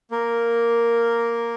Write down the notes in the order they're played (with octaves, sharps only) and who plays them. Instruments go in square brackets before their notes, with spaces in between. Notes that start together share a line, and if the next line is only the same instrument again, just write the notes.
[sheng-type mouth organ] A#3 A#4